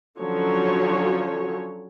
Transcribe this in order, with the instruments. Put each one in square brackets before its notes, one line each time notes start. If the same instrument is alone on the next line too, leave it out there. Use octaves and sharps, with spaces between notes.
[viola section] D3 F3 F#3 C#4 C#5